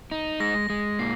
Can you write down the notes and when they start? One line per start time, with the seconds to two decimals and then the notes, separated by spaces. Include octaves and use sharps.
0.11 D#4
0.40 G#3 A#6
0.70 G#3
0.80 A#6
0.99 A#2 C7